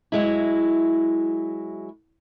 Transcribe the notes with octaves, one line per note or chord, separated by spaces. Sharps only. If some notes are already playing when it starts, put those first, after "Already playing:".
F#3 G#3 E4